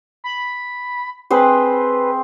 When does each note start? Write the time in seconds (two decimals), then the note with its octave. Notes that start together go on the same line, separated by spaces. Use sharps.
0.24 B5
1.30 C4 G#4 B4 C5